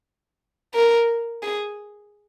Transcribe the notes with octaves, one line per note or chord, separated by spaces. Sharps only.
A#4
G#4